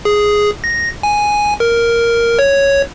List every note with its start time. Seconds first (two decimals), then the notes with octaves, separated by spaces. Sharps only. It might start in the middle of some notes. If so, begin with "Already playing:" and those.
0.05 G#4
0.64 A#6
1.03 G#5
1.60 A#4
2.39 C#5